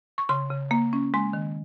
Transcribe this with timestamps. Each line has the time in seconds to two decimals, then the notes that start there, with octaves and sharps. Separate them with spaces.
0.18 C#6
0.29 C#3 C6
0.50 C#3
0.71 A#3
0.93 C#4
1.14 G#3 C6
1.33 D#3